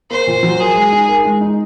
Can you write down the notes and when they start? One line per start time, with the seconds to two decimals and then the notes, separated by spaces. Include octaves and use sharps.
0.11 A#3 C5
0.27 A#2
0.43 F#3
0.60 G#4 A#4
0.75 G#3
0.92 D#4
1.09 A#4
1.25 G#3
1.41 D#4